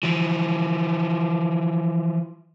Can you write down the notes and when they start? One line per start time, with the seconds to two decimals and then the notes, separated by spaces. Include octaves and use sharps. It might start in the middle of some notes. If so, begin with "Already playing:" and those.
0.03 E3 F3